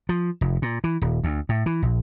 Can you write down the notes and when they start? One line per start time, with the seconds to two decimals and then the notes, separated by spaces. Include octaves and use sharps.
0.09 F3
0.41 F1
0.62 A#2
0.84 E3
1.02 D#1
1.24 D2
1.49 A2
1.66 E3
1.82 A#1